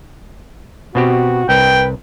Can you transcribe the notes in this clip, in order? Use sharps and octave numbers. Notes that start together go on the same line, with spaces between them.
B2 C4 F#4 G4
C2 B4 G5